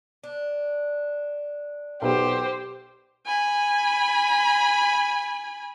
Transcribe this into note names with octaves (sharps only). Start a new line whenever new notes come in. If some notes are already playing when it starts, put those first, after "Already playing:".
D4
B1 B3 G4 C5
G#5 B5